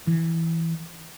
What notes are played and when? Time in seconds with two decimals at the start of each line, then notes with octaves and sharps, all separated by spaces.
0.07 E3